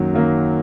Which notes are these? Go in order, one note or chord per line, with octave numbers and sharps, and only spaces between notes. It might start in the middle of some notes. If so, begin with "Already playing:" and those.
Already playing: F#2 D#3 F#3 A#3
D#3 F#3 A#3